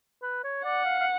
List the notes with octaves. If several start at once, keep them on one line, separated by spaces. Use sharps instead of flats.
B4
C#5
D5 F#5
F5
F5